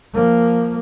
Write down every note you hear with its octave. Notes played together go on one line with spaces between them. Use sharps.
F3 A#3